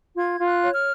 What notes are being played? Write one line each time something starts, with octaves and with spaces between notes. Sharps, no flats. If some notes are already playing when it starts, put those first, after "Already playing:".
F4 G#6
F4
F#6
C#5
F6